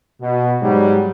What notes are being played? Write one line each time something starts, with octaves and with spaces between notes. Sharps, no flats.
B2
G#2 F#3 G3